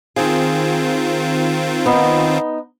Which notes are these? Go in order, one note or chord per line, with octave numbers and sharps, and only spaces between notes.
D#3 C4 F4 G#4
B3 D#4